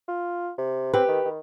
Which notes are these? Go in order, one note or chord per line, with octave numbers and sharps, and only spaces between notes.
F4
C3
C4 G4 B4
D#3
D#3